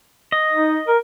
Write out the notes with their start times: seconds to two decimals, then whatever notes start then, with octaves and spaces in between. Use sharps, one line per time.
0.32 D#5
0.52 D#4
0.88 A#4